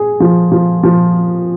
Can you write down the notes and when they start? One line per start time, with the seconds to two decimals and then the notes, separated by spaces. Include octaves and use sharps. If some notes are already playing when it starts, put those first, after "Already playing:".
Already playing: G#4
0.20 F3
0.52 F3
0.83 F3